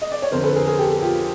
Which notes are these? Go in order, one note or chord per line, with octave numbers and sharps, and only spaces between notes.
D#5
D5
C#5
F2 D3 A#4 C5
A4 B4
G#4 A#4
G#4 A#4
G4 A4
F4 G4